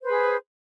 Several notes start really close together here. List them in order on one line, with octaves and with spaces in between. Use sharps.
C5 B4 G#4